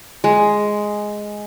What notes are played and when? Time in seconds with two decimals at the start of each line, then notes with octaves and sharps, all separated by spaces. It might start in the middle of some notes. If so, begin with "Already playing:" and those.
0.24 G#3